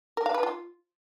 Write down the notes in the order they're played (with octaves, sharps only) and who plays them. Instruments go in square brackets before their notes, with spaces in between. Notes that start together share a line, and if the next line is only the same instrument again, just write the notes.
[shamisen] A#4
F5
B4
F4